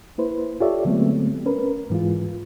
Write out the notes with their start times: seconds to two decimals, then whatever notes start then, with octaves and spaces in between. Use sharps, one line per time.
0.18 A#3 E4 B4 C5
0.60 F4 G4 A4 C#5 D5 E5
0.85 D3 F#3 G#3 A3 B3 C4
1.46 C#4 A#4 B4
1.90 G#2 E3 G#3 F4